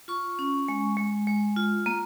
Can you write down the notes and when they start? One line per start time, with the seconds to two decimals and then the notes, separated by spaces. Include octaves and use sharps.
0.08 F4 C#6
0.39 C#4
0.68 G#3
0.97 G#3
1.27 G#3
1.56 F4
1.86 A#3